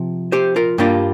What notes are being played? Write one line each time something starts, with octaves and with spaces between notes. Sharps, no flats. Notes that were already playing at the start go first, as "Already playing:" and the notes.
Already playing: C3 F3
G4 C5
F4 A#4
G2 G3 A#3 D4 F4 G4